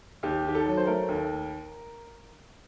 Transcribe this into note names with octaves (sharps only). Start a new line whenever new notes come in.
D#2 G4
D#3 G4
A4
F#3
C5
A3 A#4
D#2